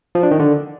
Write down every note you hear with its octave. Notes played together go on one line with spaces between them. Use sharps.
F3
D4
D#3
D3